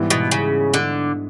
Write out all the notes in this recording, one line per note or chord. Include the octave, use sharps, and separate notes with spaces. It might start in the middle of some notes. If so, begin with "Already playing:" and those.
Already playing: G#2 E3 G3 B3 E4
B2
C#3
D3